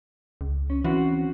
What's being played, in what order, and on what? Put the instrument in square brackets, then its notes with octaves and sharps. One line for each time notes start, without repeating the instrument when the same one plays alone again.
[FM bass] C#2
[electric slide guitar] C#4
[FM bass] E3 [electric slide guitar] C4 C#4 F#4